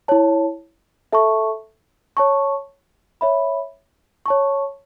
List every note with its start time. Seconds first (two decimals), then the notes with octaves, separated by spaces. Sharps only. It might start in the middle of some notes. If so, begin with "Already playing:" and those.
0.08 E4 C#5 A5
1.12 A4 E5 A5 C#6
2.17 C#5 A5 C#6
3.21 C#5 E5 B5
4.26 C#5 A5 C#6